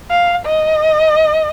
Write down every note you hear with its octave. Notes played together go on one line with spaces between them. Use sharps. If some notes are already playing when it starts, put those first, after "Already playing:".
F5
D#5